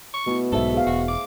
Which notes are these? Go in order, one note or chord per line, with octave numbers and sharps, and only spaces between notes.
C#6
B2 A3 B3 E4
B1 G#2 A4 C5 E5
G#4 F5
E1 F#4
D6